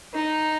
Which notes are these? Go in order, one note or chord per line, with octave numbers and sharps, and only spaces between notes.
D#4